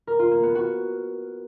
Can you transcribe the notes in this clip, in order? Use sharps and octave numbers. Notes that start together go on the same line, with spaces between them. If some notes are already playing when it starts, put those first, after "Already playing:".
A#4
F4
A#3
B3
F#4